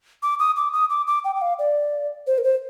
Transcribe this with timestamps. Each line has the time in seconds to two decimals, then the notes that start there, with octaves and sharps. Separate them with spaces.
0.23 D6
0.39 D#6
0.56 D6
0.73 D#6
0.90 D6
1.07 D6
1.25 G5
1.35 G5
1.42 F5
1.59 D5
2.27 C5
2.38 A#4
2.44 C5